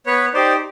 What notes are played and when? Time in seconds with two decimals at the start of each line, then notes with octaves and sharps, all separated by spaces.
0.06 B3 B4 C#5
0.34 D#4 G4 C5 D5